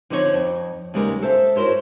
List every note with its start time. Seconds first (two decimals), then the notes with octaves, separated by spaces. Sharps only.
0.10 D3 F3 C4 D#4 F4 C#5
0.34 F2
0.94 D#2 C#3 G3 G#3 B3 A#4
1.22 A4 C5 E5 F5
1.56 E4 F#4 A#4 C5 C#5